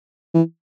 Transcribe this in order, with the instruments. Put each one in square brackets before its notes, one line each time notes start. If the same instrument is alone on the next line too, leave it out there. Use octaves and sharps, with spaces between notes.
[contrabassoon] E3